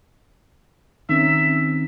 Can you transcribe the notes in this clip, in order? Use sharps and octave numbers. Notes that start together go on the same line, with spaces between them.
D#3 C4 C#4 D#4 E5